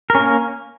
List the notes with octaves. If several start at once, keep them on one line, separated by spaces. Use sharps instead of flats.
A#3 C#4 A#4